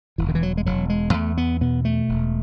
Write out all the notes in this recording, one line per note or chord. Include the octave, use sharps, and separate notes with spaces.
E1 E3
D#3
E3
F#3
G#3
E1 F#3
G#3
E2 A3
B3
B2 B3
A3
E1